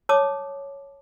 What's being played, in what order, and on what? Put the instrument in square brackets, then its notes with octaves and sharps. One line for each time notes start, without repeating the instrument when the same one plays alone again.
[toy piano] C#5 A5 D6 D#6